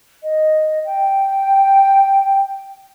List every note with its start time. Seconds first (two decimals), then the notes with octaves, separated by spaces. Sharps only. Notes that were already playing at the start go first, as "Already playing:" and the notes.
0.22 D#5
0.84 G5